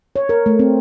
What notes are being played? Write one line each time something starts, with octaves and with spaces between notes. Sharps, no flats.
C#5
A#4
A3
C4